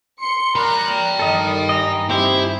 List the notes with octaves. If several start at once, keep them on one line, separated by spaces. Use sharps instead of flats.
C6 C#7
A#4 G5 A#5 B5 F#6
G2 D#3 A4 D#5
D#5 G#5 A#5
C4 E4 G4 C5